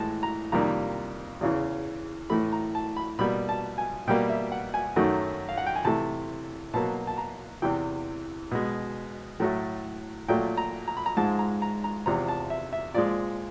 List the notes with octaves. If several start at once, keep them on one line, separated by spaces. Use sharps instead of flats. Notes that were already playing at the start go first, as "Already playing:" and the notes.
Already playing: A2 E3 G#3 A5
A#5
F2 C3 D#3 G3 A#3 A#5
E2 C#3 E3
A2 E3 A3 B5
A#5
A5
B5
B2 G3 A#3 B5
A5
G#5
B2 G3 A#3 G5
E5
F#5
G#5
F#2 D#3 F#3 A3
F5
F#5
G5
G#5
C3 E3 A3 A5
B2 F#3 A#3 A5
A5
A#5
E2 C3 E3 G5
B2 G#3
A2 F#3 A3
A#2 F#3 A3 G5
A#5
A#5
B5
A#5
G#2 F3 G#3 A5
A#5
A#5
A#5
E2 C3 F3 A#5
A5
E5
E5
A#2 F3 G#3 D5